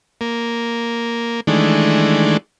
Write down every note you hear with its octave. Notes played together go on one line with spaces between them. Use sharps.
A#3
D#3 E3 G#3 A3 D4